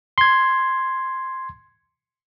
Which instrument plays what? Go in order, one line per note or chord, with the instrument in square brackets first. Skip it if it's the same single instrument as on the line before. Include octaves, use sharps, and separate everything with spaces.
[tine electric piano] C6 G#6